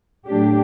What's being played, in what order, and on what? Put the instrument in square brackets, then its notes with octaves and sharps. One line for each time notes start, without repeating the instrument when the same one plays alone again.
[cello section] A2 F#3 A3 D4 G4